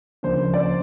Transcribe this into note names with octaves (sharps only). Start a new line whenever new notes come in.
D2 C#3 F3 A#3 D4 C5
D5